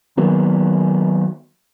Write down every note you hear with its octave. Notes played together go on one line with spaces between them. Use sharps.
D#3 F#3 A#3 B3